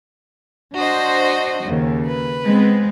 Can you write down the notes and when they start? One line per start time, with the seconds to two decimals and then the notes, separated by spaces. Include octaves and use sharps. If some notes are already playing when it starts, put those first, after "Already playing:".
0.74 D4 F#4 C5 D#5
1.65 D#2 C#3
2.06 B4
2.44 G#3 B3 C4